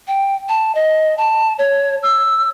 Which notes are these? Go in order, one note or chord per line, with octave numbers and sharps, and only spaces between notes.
G5
A5
D#5
A5
C#5
E6